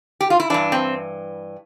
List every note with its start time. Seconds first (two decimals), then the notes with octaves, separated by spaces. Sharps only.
0.21 G4
0.30 F4
0.40 E4
0.50 G2 E3 D4
0.72 C4